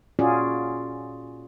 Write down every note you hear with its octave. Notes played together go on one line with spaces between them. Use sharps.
A#2 C#4 F4 F#4 G#4 D5